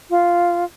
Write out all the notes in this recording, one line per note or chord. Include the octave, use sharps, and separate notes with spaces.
F4